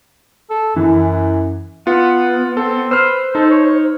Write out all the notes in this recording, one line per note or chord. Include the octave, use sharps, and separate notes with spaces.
A4
F#2 E3
B3 F4 F#5
C4 A4
B4 C5 E6 F6
D#4 A4
C#5